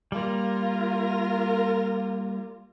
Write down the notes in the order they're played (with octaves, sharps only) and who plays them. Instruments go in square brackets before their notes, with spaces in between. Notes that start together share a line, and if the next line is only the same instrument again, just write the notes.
[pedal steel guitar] G3 A#3 [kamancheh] F4 A#4